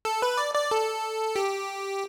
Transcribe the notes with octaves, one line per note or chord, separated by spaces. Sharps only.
A4
B4
D5
D5
A4
G4